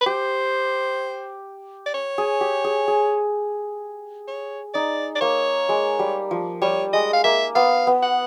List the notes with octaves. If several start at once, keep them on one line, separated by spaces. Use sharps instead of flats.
B4
G4 C5
D5
C#5
G#4
G4
G#4
G#4
C#5
D#4 D5
D5
A#3 C#5
G#3
G3
F3
G3 C#5
G#3 D#5
F5
A#3 E5
B3 F5
B3
F#5